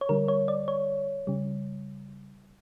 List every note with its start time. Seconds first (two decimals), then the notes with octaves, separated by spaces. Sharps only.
0.01 C#5
0.09 D3 G3 A#4
0.28 C#5
0.48 D5
0.68 C#5
1.27 C#3 G3